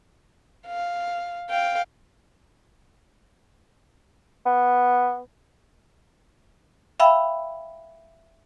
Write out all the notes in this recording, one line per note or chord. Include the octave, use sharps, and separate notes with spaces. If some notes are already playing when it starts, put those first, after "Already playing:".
F5
F5 G5
B3
E5 F5 G5 B5 E6